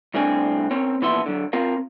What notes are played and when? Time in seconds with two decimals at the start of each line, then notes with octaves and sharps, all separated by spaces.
0.14 C2 A2 C4 D4 G#5
0.71 C4 C#4 A#4 C#5
1.02 A#2 E3 F3 B3 E5 C6
1.26 D3 F#3
1.53 C4 F4 A#4 F5